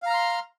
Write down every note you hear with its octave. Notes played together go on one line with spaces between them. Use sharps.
F5 A#5 C6 F6